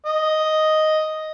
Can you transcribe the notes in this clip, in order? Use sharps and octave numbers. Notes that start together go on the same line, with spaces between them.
D#5